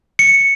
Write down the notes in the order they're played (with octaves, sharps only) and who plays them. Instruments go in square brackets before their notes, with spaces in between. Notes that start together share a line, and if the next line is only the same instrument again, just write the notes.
[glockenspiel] C#7